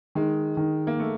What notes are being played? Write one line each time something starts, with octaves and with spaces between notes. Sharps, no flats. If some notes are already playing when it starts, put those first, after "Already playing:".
D#3 G#3
D#3
A#3
A3